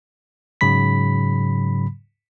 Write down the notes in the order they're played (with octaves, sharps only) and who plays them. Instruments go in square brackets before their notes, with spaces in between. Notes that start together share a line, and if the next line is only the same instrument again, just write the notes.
[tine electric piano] G#2 C#3 F#3 B5 B6